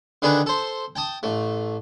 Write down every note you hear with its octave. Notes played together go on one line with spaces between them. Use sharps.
D3 D#3 D4 D#4 G#4 B4
A4 C5
G5 A5 D#6
A1 A3